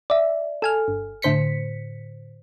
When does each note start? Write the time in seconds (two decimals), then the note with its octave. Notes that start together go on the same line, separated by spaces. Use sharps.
0.10 D5 E5
0.62 A4 G#5 F6
0.88 G1
1.22 A2 D3 C5 B6 C#7